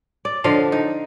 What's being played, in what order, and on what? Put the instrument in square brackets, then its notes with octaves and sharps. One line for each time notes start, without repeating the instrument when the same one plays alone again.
[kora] D5
D3 F3 D#5 F5
D#4